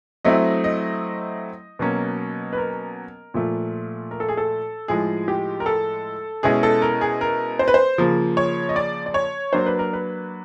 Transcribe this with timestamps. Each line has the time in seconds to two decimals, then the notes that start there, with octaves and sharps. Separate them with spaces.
0.25 F#3 A3 C4 E4 D#5
0.64 D#5
1.79 B2 F#3 A#3 C#4
2.53 B4
2.57 A#4
3.34 A#2 F3 A3
4.11 A#4
4.20 A4
4.28 G#4
4.37 A4
4.88 A2 F3 G#3 G#4
5.28 G4
5.60 A#4
5.66 A4
6.43 B2 G#3 C#4 E4 G#4
6.63 A4
6.82 A#4
7.01 G#4
7.21 A#4
7.59 C5
7.68 B4
7.74 C5
7.98 C#3 F3 A#3
8.37 C#5
8.69 D#5
8.76 D5
9.06 D5
9.14 C#5
9.53 F#3 A#3 D4 C5
9.66 B4
9.79 A#4
9.93 B4